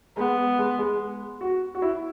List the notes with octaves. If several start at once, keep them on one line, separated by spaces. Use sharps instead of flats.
G#3 B3
G#3
G#3
F#4
F#4
E4